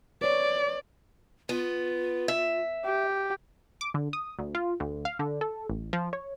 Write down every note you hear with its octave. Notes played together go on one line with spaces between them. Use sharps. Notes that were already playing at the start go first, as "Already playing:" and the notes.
B4 C#5 D5
B3 F4
E5
G4
D6
D3
D#6
D2
F4
D2
F5
D3
A4
A1
F3
C#5